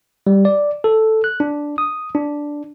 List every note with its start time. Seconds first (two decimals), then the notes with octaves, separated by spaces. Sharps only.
0.27 G3
0.45 D5
0.84 A4
1.24 F#6
1.40 D4
1.78 D#6
2.15 D4